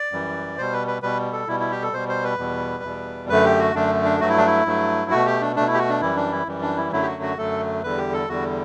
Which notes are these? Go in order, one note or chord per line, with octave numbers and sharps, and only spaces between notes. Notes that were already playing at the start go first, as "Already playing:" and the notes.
Already playing: D5
F#2 E3 G3
B2 G3 C5
B4
B4
B2 G3 B4
A4
B2 G3 E4
E4
G4
A4
B2 G3 C5
C5
B4
E2 B2 G3
E2 B2 G3
F#2 D3 A3 B4
G4
F#4
F#2 D3 A3 D4
D4
G2 F#3 A3 F#4
E4
D4
E4
G2 F#3 A3
B2 A3 F#4
G4
D4
B2 A3 D4
E4
G4
F#4
D4
F#2 E3 G3 E4
D4
E4
F#2 E3 G3
D4
E4
F#2 D3 F#3 A3 E4
G4
F#4
F#4
F#2 D3 F#3 A3 A4
E2 D3 G3 B4
G4
A4
E2 D3 G3 F#4